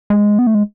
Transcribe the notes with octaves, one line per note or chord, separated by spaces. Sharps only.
G#3
B3
A3
G#3